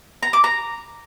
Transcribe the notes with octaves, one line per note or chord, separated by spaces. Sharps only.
A#5
D6
A#5